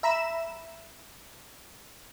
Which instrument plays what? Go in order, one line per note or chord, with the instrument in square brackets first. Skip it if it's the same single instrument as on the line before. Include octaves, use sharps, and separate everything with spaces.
[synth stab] E5 A#5 B5 E7